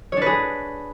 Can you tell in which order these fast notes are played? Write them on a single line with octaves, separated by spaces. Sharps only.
C#5 D4 B4 G#4